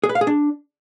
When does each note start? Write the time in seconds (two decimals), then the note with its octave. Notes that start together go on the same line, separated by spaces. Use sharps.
0.04 G#4
0.09 B4
0.15 F5
0.21 G#4
0.27 D4